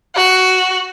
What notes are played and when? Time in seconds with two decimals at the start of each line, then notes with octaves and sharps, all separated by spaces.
0.15 F#4